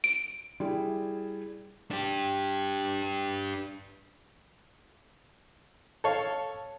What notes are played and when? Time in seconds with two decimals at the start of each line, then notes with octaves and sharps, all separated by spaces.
0.04 D7
0.60 G3 E4 G#4
1.91 D4 G4
6.04 A4 C#5 F5